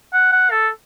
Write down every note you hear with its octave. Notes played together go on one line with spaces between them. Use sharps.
F#5
F#5
A4